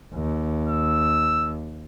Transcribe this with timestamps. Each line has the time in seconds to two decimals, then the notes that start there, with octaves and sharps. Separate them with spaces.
0.15 D#2
0.68 E6